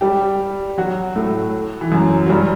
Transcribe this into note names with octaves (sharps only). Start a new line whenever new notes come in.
G3 G4
F#3 F#4
A2 A3
E3
F#2 F#3
F#3
G2 G3